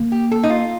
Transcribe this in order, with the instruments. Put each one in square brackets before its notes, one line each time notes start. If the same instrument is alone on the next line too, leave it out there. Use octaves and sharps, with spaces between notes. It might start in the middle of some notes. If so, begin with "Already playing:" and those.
Already playing: [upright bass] A#3
[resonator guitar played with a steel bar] G4
A4
D#4
F4